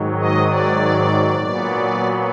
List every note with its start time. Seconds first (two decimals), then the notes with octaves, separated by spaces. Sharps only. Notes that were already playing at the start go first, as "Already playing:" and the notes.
Already playing: G#2 D#3 F#3
0.17 D#5
0.46 D5
1.36 A#2 F#3 B3